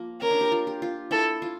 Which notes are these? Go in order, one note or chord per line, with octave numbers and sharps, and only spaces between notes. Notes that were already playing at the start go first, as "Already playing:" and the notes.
Already playing: F3 A#3
C#4 A#4
D4
G4
F4
G4
F4
E4 A4
F4